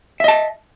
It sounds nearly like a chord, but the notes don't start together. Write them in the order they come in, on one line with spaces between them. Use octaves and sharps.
E5 D#5 A5